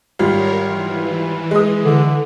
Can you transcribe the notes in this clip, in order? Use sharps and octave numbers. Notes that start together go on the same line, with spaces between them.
G#1 G3 F4 A#4 C#5
E3
G#3 D#6
D3